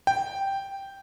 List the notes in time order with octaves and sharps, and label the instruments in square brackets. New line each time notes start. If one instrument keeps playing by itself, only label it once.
[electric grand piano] G5